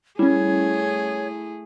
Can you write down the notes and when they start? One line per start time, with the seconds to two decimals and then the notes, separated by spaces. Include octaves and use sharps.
0.19 G3 A3 C#4 E4 G#4 C#5